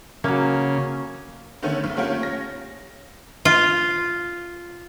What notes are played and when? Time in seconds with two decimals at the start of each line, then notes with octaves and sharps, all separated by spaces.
0.24 C#3 F#3 A#3
1.62 D3 D#3 A3 B3 C#4
1.84 B1
1.97 A3 A#3 C#4 F4 G4
2.21 C#4 A#6
3.45 F4